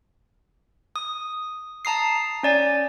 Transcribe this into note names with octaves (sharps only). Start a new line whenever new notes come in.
D#6
A5 A#5 D#6 C7
C#4 D5 G#5